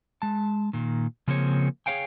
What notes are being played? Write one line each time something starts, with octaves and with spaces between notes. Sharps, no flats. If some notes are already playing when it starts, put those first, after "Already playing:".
G#3 A5
A#2 D#3
C#3 F3 A#3 C4 G#4 C#5
G#4 B4 C#5 F5 G5 G#5